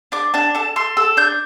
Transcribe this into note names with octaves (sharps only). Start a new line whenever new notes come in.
D4 D6
D4 A5
A4 A5
A4 C6
A4 E6
D4 G6